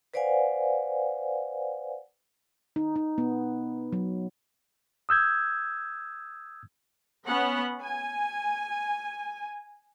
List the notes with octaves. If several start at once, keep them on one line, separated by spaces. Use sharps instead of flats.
B4 C5 D5 F5 F#5 G#5
D#4
D#4
B3
F#3
D#6 E6 G6 G#6
B3 C#4 F#5
G#5